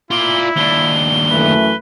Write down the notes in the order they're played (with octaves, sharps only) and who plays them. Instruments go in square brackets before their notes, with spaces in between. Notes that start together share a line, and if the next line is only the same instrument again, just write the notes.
[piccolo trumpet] E4 [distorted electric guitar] F4 D5 [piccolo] G7
[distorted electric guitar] D#2 D4 [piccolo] G7
[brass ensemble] F#2 E3 A3 [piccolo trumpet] B4